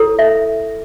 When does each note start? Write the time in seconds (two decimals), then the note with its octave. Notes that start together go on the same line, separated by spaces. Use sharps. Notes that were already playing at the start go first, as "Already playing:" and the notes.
Already playing: E4 A4 C#5
0.19 E5